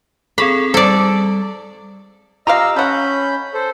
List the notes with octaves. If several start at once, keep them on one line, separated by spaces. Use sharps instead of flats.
C4 G#4 A4 B5
G3 A4 D5
F4 G4 D#5 F5 A#5 E6
C#4 A4 F#5 B5 G6
A4 C5